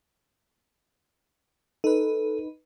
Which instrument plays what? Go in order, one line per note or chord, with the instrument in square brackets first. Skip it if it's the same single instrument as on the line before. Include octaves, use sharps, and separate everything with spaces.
[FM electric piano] D#4 B4 [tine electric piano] A4